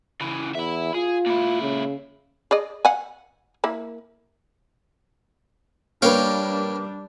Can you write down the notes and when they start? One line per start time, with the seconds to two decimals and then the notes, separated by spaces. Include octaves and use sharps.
0.21 C#3 E3
0.55 E2 E5 B5
0.94 F4 G#4
1.26 A#2 E4
1.61 C#3
2.51 G#4 D5 D#5
2.85 F5 F#5 G#5
3.64 A#3 E4
6.02 G3 A#3 D4 B4 C#5 F5 G5